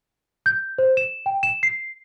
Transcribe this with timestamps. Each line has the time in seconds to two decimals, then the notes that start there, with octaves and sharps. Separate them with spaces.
0.46 G6
0.78 C5
0.97 E7
1.26 G5
1.43 E7
1.63 C7